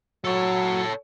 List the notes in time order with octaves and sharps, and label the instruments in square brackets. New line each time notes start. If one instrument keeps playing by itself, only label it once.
[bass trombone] F#3 [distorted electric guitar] A4 C#5